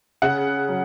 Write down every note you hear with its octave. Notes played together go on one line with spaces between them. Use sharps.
C#3 F#5
F#3